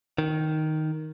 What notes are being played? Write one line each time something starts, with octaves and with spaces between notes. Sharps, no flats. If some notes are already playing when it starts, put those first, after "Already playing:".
D#3